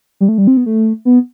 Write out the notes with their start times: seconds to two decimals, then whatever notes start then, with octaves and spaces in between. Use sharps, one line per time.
0.21 G3
0.29 A3
0.38 G3
0.47 C4
0.57 B3
0.66 A3
1.05 B3